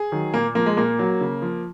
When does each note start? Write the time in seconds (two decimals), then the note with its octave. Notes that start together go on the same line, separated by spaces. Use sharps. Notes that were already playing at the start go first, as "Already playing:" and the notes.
Already playing: G#4
0.12 D#3 F#3
0.34 A#2 A#3
0.55 F3 A#3
0.66 G#3
0.77 A#2 A#3
0.99 F#3
1.21 C#3
1.42 F3